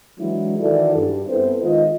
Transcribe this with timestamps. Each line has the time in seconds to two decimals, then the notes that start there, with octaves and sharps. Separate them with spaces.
0.19 E3 F#3 G#3 D4 E4
0.58 D#3 E3 E4 F#4 A4 D5
0.95 G2
1.28 B3 C4 E4 A4 B4 C5
1.61 D#3 G#3 F4 D#5